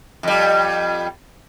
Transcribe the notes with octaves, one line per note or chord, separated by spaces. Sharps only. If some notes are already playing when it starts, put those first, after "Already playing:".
F2 G3